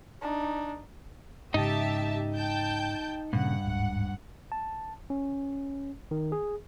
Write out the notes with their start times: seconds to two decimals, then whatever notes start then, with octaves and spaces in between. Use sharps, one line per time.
0.22 D4 D#4
1.54 G#2 C#3 D#4 G4 D#5 E5 A5
2.35 G5 A5 G6
3.33 G2 A#2 C#3 F#5
3.65 D1 G#2
4.52 A5
5.10 C#4
6.11 D#3
6.32 G#4